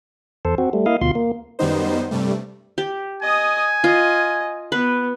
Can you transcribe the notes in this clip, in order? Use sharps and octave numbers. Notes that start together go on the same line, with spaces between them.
E2 A4 C5
C4 F#4
G3 A3
A#3 E4 D#5 F5
D2 B2 F4 C6
A#3
F#2 D#3 G3 B3 D#4 C5
G2 C3 G3 A3
G4
D#5 G#5 D#6
F4 D#5
B3 B4